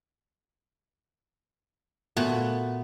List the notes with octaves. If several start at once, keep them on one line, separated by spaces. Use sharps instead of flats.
A#2 A3 B3 F#4